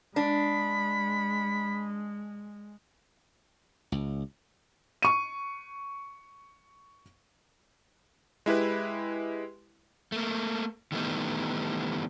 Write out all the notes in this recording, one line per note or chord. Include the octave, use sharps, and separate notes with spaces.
G#3 D4 B5
C#2
C#6 D#7
G#3 E4 G4 B4
A3 A#3
D#3 E3 G3 A3 B3 D#4